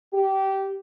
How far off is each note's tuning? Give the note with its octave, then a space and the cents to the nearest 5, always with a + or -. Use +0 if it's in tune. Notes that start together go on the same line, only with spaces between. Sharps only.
G4 -20